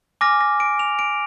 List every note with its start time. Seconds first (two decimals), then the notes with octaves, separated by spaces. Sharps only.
0.21 G#5 D6 F6 A#6
0.41 A#6
0.60 D7
0.79 F7
0.99 D7